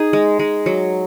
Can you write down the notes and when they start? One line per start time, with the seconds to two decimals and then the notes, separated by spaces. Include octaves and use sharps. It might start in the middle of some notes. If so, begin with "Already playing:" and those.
Already playing: D#4 G#4
0.13 G#3
0.39 G#3
0.66 F#3